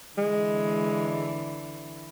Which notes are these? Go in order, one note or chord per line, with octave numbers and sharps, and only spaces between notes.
D3 E3 G#3